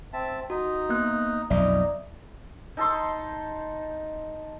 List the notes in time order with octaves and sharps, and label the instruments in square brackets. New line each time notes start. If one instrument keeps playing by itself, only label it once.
[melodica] C4 E5 A5
[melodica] D#4 [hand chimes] F#4
[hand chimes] A#3 B3 F#6
[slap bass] B1 F2 [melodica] D#4 [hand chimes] D5 E5
[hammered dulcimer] D#4 A4 A5 C6